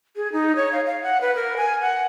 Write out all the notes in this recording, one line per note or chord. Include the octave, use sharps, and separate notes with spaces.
G#4
D#4
C#5
F5
F5
F#5
B4
A#4
G#5
F#5